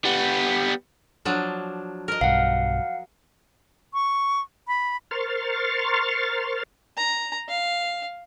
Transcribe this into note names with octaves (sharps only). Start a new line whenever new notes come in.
G3 B3
F3 F#3 D4
A#4 D#5
B1 G2 F5 F#5
C#6
B5
A#4 C5 C6 C#6 F6 A6
A#5
F5